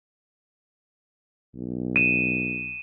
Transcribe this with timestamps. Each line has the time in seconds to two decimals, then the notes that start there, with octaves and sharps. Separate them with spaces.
1.55 B1
1.96 D#7 E7